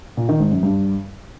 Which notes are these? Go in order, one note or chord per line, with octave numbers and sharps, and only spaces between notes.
A#2
D#3
G#2
F#2
G2